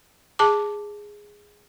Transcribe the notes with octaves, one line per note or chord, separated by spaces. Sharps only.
G#4 A5 D6